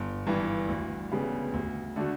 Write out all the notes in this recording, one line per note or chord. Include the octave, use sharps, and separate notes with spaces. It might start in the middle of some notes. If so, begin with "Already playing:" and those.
Already playing: G1
G2 E3
D2
C#3 G3 B3
D2
D3 A3 D4 F#4